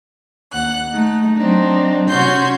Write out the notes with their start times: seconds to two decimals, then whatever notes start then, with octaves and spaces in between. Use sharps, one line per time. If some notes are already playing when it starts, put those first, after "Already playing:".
0.52 D#2 F#5 F#6
0.93 A3 D#4
1.37 F#3 C4 D4 D#4
2.08 C3 C#4 F#4 C#5 C6 G6